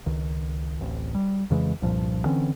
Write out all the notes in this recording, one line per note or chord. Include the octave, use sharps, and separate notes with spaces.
C#2 D#3
D1 A1
G3
F2 C#3 E3 G#3
C2 G2 A#2 F3
D3 E3 C4 C#4